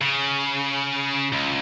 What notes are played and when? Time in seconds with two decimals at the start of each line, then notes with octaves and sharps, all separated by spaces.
0.01 C#3
1.32 C#2